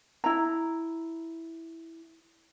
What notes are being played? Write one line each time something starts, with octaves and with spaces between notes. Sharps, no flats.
E4 A#5